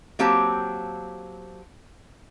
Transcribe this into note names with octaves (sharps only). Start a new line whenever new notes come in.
F#3 A#3 C4 G4 A5